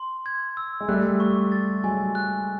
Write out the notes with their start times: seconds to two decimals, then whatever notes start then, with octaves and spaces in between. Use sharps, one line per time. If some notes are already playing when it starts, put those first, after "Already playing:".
Already playing: C6
0.26 G#6
0.57 E6
0.81 G#3
0.88 G3 A3 F#6
1.20 C#6
1.52 A6
1.84 F#3 G#3 G#5
2.15 F#6